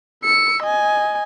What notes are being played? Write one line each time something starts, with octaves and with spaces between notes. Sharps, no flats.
E6 C#7
D#5 G#5